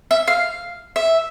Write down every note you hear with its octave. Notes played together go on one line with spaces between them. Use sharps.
E5
F5
E5